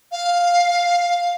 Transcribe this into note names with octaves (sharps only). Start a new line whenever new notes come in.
F5